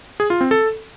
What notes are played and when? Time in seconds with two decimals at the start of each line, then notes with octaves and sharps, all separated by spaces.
0.20 G#4
0.30 F4
0.41 C4
0.51 A4